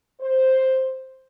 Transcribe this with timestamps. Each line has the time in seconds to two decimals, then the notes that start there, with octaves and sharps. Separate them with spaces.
0.20 C5